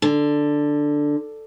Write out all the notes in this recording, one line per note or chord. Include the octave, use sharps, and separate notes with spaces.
D3